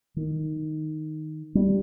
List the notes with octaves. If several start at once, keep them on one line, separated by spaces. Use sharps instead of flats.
D#3
G3